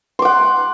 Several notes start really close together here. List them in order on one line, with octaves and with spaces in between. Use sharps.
C6 D6 F#5